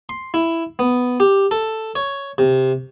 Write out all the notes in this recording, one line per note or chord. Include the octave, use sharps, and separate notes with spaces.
C6
E4
B3
G4
A4
C#5
C3